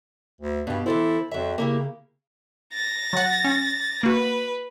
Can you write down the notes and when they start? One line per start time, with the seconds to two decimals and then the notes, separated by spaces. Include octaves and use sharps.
0.41 D2
0.67 G2 B2 G4
0.86 E3 E4 A4 C5
1.31 F2 F#3 E5
1.58 C#3 A#3 E4 G4
2.74 A6 A#6
3.13 F#3 F#5
3.44 C#4
4.03 A#3 F#4 B4